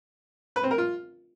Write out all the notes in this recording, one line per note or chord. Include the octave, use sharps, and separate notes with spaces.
B4
C4
A#4
F4